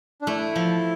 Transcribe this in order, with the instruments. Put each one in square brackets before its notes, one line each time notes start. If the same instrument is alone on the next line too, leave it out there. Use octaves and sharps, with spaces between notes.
[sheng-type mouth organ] D4
[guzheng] A3 [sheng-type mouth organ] E4
[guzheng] F3